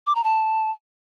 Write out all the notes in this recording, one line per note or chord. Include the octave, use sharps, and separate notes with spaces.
D6
A#5
A5